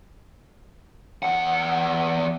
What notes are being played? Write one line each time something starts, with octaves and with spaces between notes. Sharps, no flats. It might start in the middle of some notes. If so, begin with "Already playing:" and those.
E2 F#5